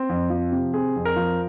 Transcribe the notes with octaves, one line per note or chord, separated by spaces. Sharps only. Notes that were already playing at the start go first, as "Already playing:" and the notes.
Already playing: C4
F2
F3
C3
C4 G#4
F2
A#4
F3